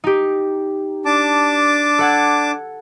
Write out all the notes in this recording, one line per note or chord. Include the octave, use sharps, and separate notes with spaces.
D#4 G4
D4 A5 D6
A4 F#5 G#6